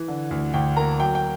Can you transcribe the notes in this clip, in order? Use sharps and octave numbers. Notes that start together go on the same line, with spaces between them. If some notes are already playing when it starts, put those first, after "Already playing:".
Already playing: E3
D3
D2
D2 G5
A#3 A#5
F#3 G5
G5